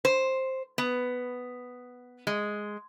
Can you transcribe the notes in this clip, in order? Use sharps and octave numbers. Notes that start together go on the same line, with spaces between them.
C5
B3
G#3